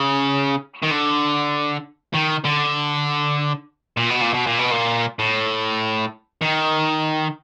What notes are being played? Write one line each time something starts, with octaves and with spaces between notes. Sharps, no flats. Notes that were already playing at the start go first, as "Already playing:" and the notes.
Already playing: C#3
D#3
D3
D#3
D3
A#2
B2
A#2
B2
A#2
B2
A#2
A2
D#3